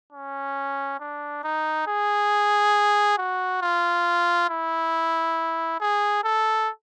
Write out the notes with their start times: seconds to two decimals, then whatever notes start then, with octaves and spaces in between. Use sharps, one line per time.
0.13 C#4
1.00 D4
1.44 D#4
1.87 G#4
3.18 F#4
3.62 F4
4.50 E4
5.80 G#4
6.24 A4